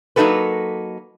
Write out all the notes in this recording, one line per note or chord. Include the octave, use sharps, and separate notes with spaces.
F#3 A#3 D#4 F#4 A4 B4